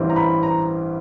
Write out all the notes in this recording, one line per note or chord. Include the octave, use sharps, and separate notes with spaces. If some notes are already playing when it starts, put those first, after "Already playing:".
Already playing: A1 G2 E3 G3 C4
A#5
B5
A#5